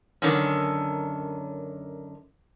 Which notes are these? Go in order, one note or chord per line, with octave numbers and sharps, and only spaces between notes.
F#2 A#2 D3 D#3 C#4